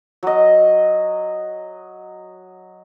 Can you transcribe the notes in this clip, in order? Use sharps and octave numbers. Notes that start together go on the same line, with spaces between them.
F#3 D#5